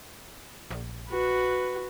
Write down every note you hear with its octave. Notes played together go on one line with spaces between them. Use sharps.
A#1
F#4 B4